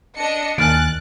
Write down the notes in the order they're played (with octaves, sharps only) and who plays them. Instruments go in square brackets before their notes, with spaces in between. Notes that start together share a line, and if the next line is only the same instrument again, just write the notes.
[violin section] D4 D#5 C#7
[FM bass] D#2 [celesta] G#5 F6 D7 [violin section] F#6 A6